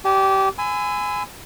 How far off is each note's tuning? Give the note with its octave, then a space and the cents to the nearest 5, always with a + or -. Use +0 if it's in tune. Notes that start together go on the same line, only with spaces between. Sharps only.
G4 -20 D5 +0 G#5 +30
G#5 +0 B5 +40 E6 +0